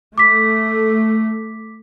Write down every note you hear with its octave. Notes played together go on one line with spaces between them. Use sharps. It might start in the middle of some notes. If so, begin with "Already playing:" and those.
A3 D6 B6